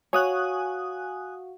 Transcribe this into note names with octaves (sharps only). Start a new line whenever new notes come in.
F#4 C#5 F5 F#5 G#5 D#6 F#6